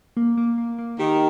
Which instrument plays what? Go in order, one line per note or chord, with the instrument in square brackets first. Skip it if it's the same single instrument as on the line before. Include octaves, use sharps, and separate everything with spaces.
[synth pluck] A#3
A#3
A#3
A#3
[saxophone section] D#3 [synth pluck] G4